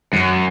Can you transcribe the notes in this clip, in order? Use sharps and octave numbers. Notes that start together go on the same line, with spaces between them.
F#2